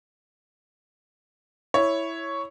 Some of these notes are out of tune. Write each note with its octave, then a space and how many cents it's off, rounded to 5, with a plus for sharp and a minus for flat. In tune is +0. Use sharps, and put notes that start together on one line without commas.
E4 +0 C#5 +0